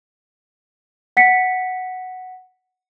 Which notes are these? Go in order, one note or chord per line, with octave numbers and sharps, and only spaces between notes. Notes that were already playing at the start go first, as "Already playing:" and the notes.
F#5 B6 C#7